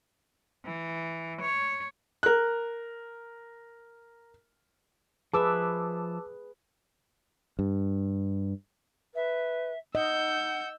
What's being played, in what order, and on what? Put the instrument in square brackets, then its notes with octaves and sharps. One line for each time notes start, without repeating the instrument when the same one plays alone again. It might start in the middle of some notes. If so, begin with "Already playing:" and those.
[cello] E3
C#5
[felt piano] A#4 F#6
[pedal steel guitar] F3 E5 [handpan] G#4 B4 [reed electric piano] A5 D6 E6
[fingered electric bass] G2
[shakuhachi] B4 [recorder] E5
[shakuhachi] D#4 [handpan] D#5 [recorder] F#5 [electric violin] E6 G6